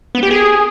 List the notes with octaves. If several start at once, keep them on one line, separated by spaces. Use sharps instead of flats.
B3
G4
G#4